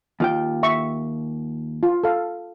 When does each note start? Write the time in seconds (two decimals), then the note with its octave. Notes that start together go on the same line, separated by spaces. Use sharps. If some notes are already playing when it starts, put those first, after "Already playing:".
0.20 D#2 F4 G5
0.63 E5 C#6
1.83 F4
2.04 A4 F5